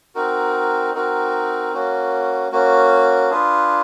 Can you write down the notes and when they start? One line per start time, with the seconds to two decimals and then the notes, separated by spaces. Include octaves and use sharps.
0.15 C4 D#4 F#4 A#4
0.95 C4 D#4 F#4 A#4
1.74 A#3 C#4 F#4
2.52 A#3 C#4 F#4
3.30 D4 F4 G#4 B4